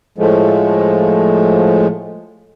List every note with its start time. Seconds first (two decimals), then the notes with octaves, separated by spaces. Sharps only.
0.18 A2 F3 G#3 A3